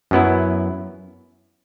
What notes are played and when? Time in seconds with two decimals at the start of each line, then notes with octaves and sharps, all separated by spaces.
0.11 F#2 F#3 B3 E4